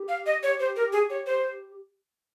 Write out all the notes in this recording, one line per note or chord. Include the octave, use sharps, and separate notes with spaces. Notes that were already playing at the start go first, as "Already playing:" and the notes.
Already playing: G4
F5
D#5
C#5
C5
A#4
G#4
C#5
C5